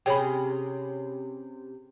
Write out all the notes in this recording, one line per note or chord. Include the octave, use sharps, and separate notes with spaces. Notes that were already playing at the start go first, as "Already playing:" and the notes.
C3 C#4 G#4 G5 B5